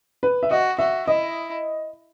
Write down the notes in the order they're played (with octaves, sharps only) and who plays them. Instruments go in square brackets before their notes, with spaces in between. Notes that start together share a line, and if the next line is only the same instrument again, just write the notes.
[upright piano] B4
E5
[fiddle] F#4 [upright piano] D#5
[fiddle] F#4 [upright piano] E5
[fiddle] E4 [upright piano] D#5